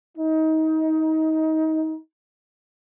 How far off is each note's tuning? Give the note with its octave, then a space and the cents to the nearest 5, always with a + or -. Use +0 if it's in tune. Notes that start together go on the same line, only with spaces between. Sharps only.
D#4 +25